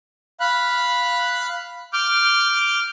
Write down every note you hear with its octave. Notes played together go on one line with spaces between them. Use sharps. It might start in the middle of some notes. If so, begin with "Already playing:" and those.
F5 B5 F#6
D6 F6 G6